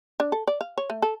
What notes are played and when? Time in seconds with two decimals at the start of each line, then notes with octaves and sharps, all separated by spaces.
0.20 D4
0.32 A4
0.47 D5
0.61 F5
0.78 C#5
0.90 A3
1.02 A4